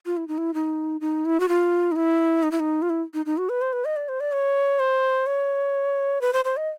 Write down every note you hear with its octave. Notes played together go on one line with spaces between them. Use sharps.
F4
E4
D#4
E4
D#4
D#4
E4
F#4
F4
D#4
E4
D#4
E4
D#4
F4
E4
D#4
D#4
F#4
B4
C5
B4
D#5
D5
C5
D5
C#5
C5
C#5
B4
C5
C5
D#5